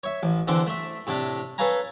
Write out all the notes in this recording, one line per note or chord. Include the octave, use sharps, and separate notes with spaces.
C#5 E5
A1
E2 D3 C4 A4 D6
A3 E5
A2 C3 D4
A4 B4 C#5 F5 G#5 A#5